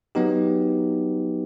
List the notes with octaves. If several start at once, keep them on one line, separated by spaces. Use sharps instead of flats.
F#3 B3 D#4 G4